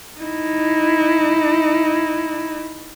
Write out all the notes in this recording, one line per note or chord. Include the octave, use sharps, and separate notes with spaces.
D#4 E4